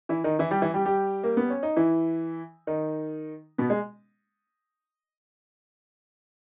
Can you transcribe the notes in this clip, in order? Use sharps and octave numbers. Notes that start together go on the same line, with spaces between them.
E3 E4
D#3 D#4
E3 E4
G3 G4
E3 E4
G3 G4
G3 G4
A#3
B3
C#4
D#4
E3 E4
D#3 D#4
B2 B3
G#3